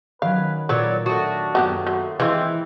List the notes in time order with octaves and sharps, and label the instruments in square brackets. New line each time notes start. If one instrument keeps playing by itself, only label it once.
[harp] D#3 F#3 C#4 [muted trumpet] B4 [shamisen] F5
[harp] A#2 [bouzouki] F#3 C#5 [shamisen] B4 [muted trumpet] D5
[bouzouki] A3 F#4 [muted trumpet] D4 [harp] D#6 A6
[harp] F#2 A#3 D#6 [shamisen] F#3 B3 G4
[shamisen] F#3 [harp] C6 G6
[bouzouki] E3 [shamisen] G#3 F4 [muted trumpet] C4 [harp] E4